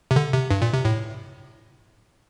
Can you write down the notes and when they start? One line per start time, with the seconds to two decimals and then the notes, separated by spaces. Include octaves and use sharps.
0.11 C3
0.16 D3
0.33 C3
0.51 G2
0.62 A#2
0.73 C3
0.85 A2